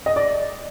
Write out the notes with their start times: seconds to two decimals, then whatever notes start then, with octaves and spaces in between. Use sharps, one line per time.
0.06 D#5
0.16 D5